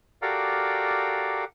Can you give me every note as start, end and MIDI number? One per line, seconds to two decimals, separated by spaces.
0.22 1.44 66
0.22 1.44 67
0.22 1.44 69
0.22 1.44 70
0.22 1.44 74
0.22 1.44 77